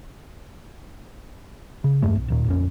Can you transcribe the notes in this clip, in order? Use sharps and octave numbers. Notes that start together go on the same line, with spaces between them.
C#3
E2 G2 A3
B1
D1 D#2 A#2
A#1 F2 C#4